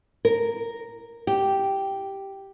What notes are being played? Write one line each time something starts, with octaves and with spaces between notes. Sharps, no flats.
A#4
G4